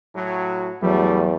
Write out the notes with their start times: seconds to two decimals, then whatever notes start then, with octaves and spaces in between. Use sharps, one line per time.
0.16 A2 F#3
0.82 E2 A2 F#3 G3 A3